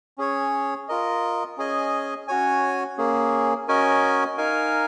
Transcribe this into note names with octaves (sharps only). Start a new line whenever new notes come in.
C#4 G#4 C#5
F4 A#4 D#5
C#4 G#4 D#5 G#5
C#4 F#4 C#5 G#5
A#3 C#4 G#4
C#4 F#4 A#4 D#5 G#5
D#4 A#4 F5 G#5